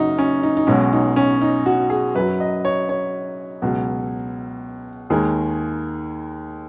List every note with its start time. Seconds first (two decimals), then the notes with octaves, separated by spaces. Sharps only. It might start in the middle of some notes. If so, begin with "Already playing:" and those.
Already playing: F#1 F#2 F#3 D#4 F#4
0.18 C#4
0.43 D#4
0.57 D#4
0.67 B1 B2 G#3 C#4
0.93 D#4
1.16 C#4
1.41 D#4
1.66 F#4
1.90 G#4
2.15 F#2 F#3 B4
2.40 D#5
2.65 C#5
2.89 C#5
3.62 C#2 B2 F#3
5.10 D#2 D#3 G#3 G#4